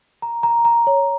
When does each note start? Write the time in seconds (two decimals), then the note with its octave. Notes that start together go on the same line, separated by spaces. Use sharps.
0.22 A#5
0.43 A#5
0.65 A#5
0.87 C#5